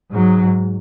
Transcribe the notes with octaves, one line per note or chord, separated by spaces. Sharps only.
G#2 F#3